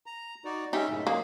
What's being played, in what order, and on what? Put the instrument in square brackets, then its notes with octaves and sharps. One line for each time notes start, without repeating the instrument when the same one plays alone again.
[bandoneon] A#5
D#4 F#4 D5
[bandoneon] G#3 C#4 E5 [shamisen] D#4 G4
[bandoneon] F#2 A2 C#3
[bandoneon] F#3 G#3 G#4 [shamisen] A#3